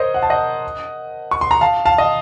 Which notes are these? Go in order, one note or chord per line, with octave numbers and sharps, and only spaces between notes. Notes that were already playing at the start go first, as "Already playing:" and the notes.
Already playing: A#4 C5 C#5 D#5
F#5
A5
D#5 F#5
C#6
C6
A#5
F5 A5
F5 A5
D#5